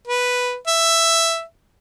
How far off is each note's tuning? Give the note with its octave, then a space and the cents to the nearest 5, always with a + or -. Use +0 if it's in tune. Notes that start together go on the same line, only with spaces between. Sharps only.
B4 +0
E5 +5